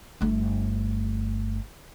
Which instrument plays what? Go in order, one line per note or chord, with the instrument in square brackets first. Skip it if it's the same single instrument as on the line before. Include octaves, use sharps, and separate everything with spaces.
[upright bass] G1 A3